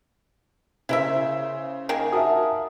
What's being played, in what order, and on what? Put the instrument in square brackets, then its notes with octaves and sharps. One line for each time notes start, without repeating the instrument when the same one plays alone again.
[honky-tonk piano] C#3 C5 [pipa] E4 A#4 E5
[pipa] D#3 A#3 G#4
[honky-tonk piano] F#4 A#4 [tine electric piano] E5 A5 D#6